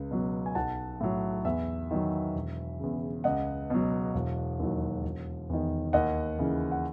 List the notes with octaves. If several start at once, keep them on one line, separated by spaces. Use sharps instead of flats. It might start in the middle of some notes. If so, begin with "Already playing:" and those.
Already playing: C#2
B2 F#3
G#5
B1 F#5 A5
A2 F#3
E2 E5
D#3 F#3
E1
E2 C#3
C#2 D#5 F#5
B2 F#3
E1
D#2 D#3 F#3
E1
E2 D#3
D#2 D#5 F#5
C#3 E3
F#5